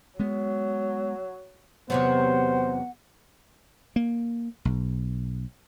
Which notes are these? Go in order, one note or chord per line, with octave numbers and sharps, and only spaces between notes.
F#3 G#3 B3
E2 C3 F#3 B3 C5 F#5
A#3
B1